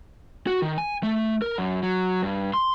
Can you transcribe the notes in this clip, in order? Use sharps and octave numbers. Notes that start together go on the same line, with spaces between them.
F#4
D#3
G#5
A3
A#4
F#2
F#3
G2
C6